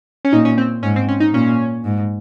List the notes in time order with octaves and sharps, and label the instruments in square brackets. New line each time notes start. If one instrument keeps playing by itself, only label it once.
[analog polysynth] C#4
[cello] A#2 [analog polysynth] D#4
[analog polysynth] C#4
C4
[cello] G#2 [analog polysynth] C#4
[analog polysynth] C4
C#4
D#4
[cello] A#2 [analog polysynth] C#4
[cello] G#2